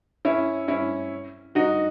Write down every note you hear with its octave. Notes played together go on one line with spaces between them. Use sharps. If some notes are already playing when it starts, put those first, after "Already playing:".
C#4 E4
C#4 E4
D#4 F#4